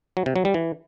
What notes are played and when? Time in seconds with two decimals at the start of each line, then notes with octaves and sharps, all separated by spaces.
0.17 F#3
0.26 C3
0.36 F#3
0.45 G3
0.54 E3